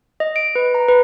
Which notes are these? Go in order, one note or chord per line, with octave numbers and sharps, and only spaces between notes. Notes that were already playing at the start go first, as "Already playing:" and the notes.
D#5
D7
B4
A#5
B4